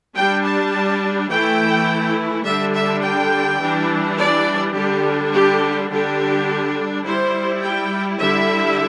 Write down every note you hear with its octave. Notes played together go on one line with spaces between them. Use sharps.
G3 D4 G5
A5
E3 A3 E4 G5
D3 G3 D4 E5
E5
G5
E3 G3 D4
D5
D3 G3 D4 G4
G4
D3 G3 D4 G4
G3 E4 C5
G5
D3 G3 E4 E5